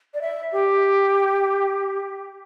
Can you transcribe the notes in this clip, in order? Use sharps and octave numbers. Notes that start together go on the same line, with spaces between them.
D5
E5
G4